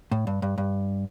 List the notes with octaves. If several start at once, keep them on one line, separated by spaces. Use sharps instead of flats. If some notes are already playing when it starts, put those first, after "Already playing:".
A2
G2
G2
G2